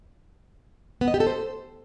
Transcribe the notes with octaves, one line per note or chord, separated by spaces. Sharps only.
B3
D#5
G4
A4
C5